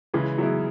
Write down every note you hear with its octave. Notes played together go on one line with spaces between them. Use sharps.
C#3 E3 G#3
F#3 B3 E4